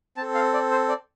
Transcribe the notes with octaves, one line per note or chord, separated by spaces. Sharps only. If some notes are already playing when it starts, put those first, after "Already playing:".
C4 A4 A5
F5
D5
C5
D5